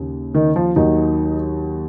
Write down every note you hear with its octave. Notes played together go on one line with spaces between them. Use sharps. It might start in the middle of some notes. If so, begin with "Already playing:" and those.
Already playing: D#2 C#3
D#3 D#4
F3 F4
D#2 D#3 F#3 D#4